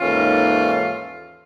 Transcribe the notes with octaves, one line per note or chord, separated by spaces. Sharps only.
D#2 G#2 E3 C#4 F4 A4